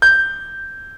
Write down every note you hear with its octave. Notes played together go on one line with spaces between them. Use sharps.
G6